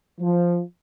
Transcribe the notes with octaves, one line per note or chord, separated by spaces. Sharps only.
F3